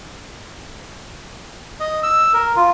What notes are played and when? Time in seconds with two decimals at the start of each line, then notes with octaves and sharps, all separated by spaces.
1.80 D#5
2.03 E6
2.34 A#4
2.56 F4